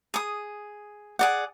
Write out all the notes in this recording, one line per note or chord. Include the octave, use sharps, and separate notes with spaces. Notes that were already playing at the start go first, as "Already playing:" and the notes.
G#4 D#6
G#4 D5 F#5